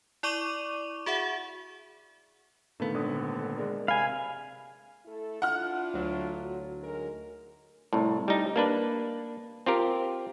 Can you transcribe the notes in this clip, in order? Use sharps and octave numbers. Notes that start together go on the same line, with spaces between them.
E4 D5 C#6 D6 D#7 F7
F#4 G#4 E5 F#5
A#2 D3 D#3 A3 B3 A4 F5
G#1 D3 D#6
D4 A4
G#3 D4 A#4
C3 F5 G#5 B5
A3 E4 A4
D4 E4 F4 F#5 F6
D2 F#3
G#3 D#4 A#4
C2 A2
G3 D#4
A#3 D4 B4
C4 F4 G4 A#4